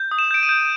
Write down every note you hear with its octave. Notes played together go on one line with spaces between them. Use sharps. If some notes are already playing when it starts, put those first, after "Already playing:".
Already playing: G6
D#6
E7
G6 D7
D#7
G6